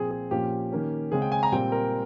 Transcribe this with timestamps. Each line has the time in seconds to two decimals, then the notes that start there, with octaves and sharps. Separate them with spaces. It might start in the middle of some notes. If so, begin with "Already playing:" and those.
Already playing: A#2 F3 C4 G#4
0.11 G#4
0.31 A#2 F3 A#3 C#4 G4
0.72 D#3 A#3 C#4
1.12 C#3 G#3 C4 G#4
1.22 G5
1.32 G#5
1.43 A#5
1.52 A#2 G3 C4 G5
1.72 A#4